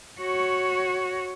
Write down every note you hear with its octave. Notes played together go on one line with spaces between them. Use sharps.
F#4 C#5